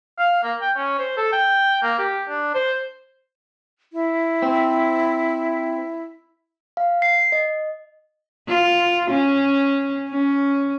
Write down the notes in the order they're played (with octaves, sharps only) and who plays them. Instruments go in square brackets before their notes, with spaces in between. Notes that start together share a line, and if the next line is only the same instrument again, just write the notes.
[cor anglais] F5
A#3
G5
C#4
C5
A4
G5
A#3
G4
D4
C5
[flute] E4
[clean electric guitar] C4
[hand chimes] F5
C7
D#5
[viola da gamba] F4
C#4
C#4